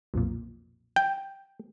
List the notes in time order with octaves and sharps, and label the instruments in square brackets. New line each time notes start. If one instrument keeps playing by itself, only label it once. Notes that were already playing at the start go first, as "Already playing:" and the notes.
[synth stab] B1 F2 A#2
[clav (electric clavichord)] G5